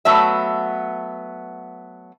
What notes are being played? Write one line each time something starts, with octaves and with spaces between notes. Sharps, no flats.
F#3 A3 B3 E5